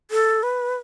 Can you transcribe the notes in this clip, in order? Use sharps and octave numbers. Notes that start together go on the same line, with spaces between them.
A4
B4